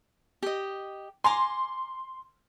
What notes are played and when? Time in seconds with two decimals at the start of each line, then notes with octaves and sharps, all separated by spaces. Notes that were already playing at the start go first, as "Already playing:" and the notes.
0.43 G4 D#5
1.24 G#5 A#5 C6 D6